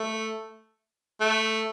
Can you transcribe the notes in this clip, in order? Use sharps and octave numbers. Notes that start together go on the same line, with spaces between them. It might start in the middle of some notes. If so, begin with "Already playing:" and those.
Already playing: A3
A3